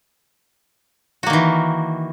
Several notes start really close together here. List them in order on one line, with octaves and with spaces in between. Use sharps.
F#4 A#3 D#3 E3